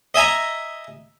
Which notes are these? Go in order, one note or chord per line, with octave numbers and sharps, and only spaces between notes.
D#5 E5 G#5 A#5